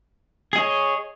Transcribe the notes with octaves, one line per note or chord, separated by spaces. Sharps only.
G#4 C#5 D#5